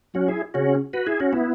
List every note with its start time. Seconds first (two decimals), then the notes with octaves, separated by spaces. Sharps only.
0.14 F#3 C#4 F#4
0.28 E4 G#4
0.54 C#3 C#4 F#4
0.93 F#4 B4
1.07 E4 G#4
1.20 C#4 F#4
1.33 B3 E4